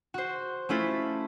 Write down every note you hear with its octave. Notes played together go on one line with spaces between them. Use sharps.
F#4 C5
A3 C#4 E4 F4 A4